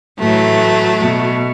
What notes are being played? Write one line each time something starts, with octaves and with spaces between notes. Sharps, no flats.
A2 E3 F#3 A3
B2